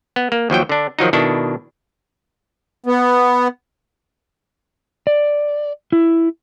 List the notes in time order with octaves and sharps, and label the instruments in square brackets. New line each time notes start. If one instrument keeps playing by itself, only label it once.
[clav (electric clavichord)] B3
A#3
D#2 F3 F#3 G5
D3 D4
D#3 F3 F#3 D#4
B2 D#3 D4 E4 A4
[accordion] B3
[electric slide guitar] D5
E4